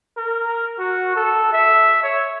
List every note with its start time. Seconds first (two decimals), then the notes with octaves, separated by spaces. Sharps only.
0.17 A#4
0.79 F#4
1.15 A4
1.53 E5
2.03 C#5